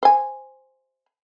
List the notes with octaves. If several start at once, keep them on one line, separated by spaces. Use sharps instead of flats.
C5 G#5